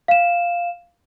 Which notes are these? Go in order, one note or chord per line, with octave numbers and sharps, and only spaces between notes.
F5 E7